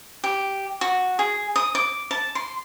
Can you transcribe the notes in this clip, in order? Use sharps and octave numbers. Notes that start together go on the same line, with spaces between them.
G4
F#4
G#4
D#6
D6
A5
C6